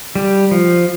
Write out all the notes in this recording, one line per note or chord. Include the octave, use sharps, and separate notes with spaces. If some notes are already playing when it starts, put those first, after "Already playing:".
G3
F3